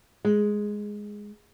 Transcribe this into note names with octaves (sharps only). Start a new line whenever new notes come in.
G#3